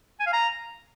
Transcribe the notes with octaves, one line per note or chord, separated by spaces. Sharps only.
G#5
F5
A#5